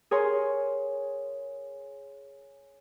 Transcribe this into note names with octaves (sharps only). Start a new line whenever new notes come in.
G#4 A#4 C#5 G#5 C6